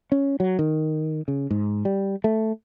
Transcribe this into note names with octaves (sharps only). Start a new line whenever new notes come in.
C#4
F#3
D#3
C#3
G#2
G3
A3